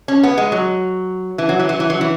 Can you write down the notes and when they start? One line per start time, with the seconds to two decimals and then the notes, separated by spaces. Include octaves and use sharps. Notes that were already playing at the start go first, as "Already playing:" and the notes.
0.08 C#4
0.23 B3
0.38 G#3
0.52 F#3
1.38 E3
1.49 F#3
1.59 E3
1.69 F#3
1.80 E3
1.90 F#3
2.01 E3